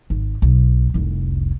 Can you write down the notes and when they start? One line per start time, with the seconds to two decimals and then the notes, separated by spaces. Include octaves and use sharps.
0.10 G#1
0.42 B1
0.94 F1 C2